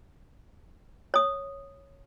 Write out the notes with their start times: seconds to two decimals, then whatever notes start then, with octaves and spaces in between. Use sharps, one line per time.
1.14 C#5 D#6